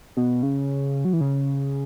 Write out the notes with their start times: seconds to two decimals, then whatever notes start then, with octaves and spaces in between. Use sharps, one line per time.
0.17 B2
0.43 C#3
1.05 F#3
1.13 E3
1.21 C#3